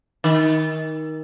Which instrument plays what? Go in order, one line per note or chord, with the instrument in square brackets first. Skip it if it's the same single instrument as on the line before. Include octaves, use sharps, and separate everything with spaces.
[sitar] D#3